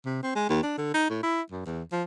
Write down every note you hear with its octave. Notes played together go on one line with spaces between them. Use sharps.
C3
C4
G#3
D#2
D4
D3
D#4
A2
E4
F#2
E2
F3